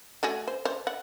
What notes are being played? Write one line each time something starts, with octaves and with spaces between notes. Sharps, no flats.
A3 F#4 G#4
C5
C5
F#5